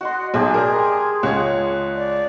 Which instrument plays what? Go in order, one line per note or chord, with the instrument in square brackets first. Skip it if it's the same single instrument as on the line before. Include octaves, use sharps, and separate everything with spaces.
[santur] F#4 F#5 C6 [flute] D#5
[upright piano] B1 [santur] G#3 G4 A5 [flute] G#4
[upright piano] A#4 D5 A#5
[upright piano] C#2 C#5 G#6 [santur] F#5
[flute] D5